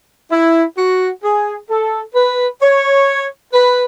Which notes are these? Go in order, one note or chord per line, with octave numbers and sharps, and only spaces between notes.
E4
F#4
G#4
A4
B4
C#5
B4